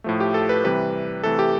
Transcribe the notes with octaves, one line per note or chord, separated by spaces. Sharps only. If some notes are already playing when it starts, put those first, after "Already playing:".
A2 F3 A3
G4
A4
B4
C3 E3 G3 B4
C3 E3 A3 A4
G4